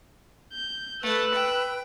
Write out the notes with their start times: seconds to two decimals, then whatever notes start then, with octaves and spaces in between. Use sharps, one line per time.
0.53 G6
1.03 A3 B4 E6 F#6
1.34 G5